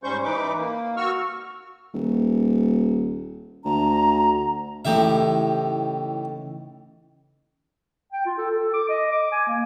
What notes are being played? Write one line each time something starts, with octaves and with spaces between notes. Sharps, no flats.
G#2 G3 C#4 C5 C#6 G6
E3 D#4 B4 D6
A#3
F#4 C#6 E6 F6
D#1
D2 A#5
A2 C#3 E3 D#4 G4 E5
G5
F4
A4
A4
D6
D#5
D6
G#5
A#3